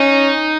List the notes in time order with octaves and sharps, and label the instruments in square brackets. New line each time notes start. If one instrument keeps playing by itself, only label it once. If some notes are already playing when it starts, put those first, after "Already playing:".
Already playing: [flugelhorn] C#4 [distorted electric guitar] D#4